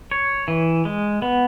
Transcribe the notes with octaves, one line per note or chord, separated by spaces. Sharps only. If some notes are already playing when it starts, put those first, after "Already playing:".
C#5
E3
G#3
B3